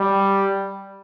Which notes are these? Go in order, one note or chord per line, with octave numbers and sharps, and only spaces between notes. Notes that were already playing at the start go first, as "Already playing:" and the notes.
Already playing: G3